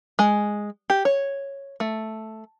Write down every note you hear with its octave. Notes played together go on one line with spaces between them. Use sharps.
G#3
G4
C#5
A3